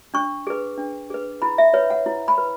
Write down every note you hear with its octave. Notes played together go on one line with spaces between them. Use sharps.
D4 C#6
G#4 B4
D4
G#4 B4
E4 B5
E5
B4 C#5
F#5
E4
B5
B4